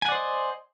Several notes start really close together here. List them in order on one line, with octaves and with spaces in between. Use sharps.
G#5 F#5 D5 C5 D#5